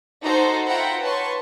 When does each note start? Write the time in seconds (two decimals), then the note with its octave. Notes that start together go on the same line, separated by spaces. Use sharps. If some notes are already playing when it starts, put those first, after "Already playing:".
0.22 D#4 F#4 A4 C5 A#5 C6
0.66 F4 E5 F#5 G5 A#5 B5
1.02 B4 C#5 A5 C6 C#6